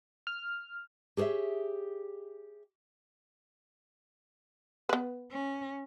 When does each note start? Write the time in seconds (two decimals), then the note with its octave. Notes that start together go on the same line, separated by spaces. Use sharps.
0.27 F6
1.17 G4 G#4 C5 C#5 E5
4.89 B3 B4
5.31 C#4